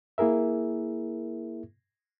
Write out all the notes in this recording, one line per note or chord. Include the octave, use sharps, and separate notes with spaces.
A#3 E4 G#4 A#4 E5